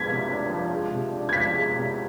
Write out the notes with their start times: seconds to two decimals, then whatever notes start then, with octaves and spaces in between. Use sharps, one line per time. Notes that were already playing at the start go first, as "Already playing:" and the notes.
Already playing: F3 G#3 D4 G#6 B6
0.08 C3
0.29 D4
0.49 F3
0.71 G#3
0.91 C3
1.12 D4
1.29 G#6
1.33 F3 B6
1.54 G#3
1.74 C3